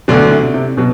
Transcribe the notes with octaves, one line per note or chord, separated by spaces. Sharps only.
D2 B2 D3 F#3
C3
C3
B2 F#3